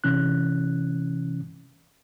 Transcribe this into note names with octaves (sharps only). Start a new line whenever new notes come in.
C3 E3 C#4 F#6